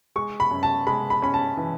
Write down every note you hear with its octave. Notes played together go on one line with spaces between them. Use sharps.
G#3 C#6
B5
F#2
A5
G#3 B5
B5
C#4 B5
A5
E3